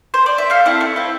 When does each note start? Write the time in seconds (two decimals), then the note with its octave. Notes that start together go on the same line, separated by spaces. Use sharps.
0.14 C5
0.26 D5
0.38 E5
0.50 A3 F5
0.65 C4 E4 A4
0.81 A3
0.96 C4 E4 A4